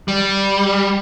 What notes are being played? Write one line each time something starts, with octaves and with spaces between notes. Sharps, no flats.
G3